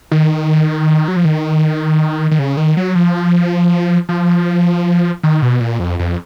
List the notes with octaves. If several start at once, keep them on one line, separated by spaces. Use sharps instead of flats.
D#3
F#3
F3
D#3
D#3
C#3
D#3
F#3
F3
F3
D#3
B2
A#2
F2
F2